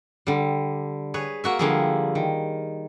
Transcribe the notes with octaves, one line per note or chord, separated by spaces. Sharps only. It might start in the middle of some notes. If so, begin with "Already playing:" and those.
D3 G3
G#4 B4 C#5
A#3 F#4 E5
D3 F3 G3 A#3 E4 G#4
D#3